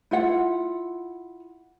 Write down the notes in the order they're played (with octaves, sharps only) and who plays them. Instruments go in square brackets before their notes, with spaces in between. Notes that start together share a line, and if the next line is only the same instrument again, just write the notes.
[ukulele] E4 F4 F#5